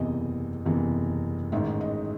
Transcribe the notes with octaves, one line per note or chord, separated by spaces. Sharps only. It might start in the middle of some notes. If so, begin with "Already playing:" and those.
Already playing: F#1 E2 C3 E3 D#5
F#1 E2 C3 E3
A1 G#2 D#3 G#3 E5
D#5